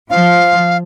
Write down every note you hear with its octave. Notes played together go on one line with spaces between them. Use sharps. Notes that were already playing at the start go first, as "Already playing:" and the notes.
F3 F5